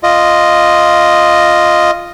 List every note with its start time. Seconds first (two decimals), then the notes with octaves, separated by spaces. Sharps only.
0.03 F4 D#5